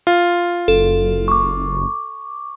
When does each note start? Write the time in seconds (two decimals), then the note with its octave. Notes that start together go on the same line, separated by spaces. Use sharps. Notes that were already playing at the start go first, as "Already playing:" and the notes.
0.07 F4
0.68 F#1 A4
1.28 C#6 D6